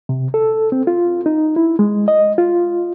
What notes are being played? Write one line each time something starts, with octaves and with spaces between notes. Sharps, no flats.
C3
A4
C4
F4
D#4
E4
G#3
D#5
F4